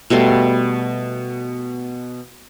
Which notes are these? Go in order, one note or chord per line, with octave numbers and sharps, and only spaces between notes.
B2 G3 A3 C6